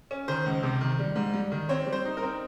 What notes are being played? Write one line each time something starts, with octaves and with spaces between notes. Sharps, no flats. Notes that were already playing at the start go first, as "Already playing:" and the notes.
C#4
D#3 C5
C#2
C3
D#3
G3
G#2
G3
D#3
C4 C#5
G3
C5
D#4
A#4
C4